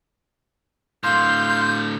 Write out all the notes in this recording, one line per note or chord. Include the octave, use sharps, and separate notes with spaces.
A2 D3 F5 C6 G6